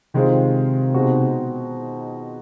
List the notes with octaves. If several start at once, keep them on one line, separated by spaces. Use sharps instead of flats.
C3 D#3 G#3 C4 F4
B2 G#3 C4 D#4 F#4